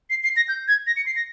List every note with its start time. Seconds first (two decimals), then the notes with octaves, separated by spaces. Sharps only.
0.10 C7
0.24 C7
0.36 A#6
0.48 G6
0.68 G#6
0.87 A#6
0.96 C#7
1.06 C7
1.16 A#6